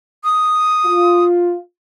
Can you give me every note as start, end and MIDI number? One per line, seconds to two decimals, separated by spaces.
0.24 1.24 87
0.85 1.60 65